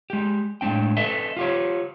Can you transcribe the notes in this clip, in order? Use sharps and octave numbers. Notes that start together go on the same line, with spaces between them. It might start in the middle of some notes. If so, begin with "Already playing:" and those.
G#3 G4
A2 G#3 C#4 D4 G5
A4 B4 D#5 E5
F4 G4 C#5